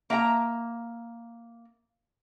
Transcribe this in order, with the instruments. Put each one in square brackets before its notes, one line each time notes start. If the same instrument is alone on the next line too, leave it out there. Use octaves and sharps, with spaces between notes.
[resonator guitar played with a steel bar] A#3 E5 F#5 A#5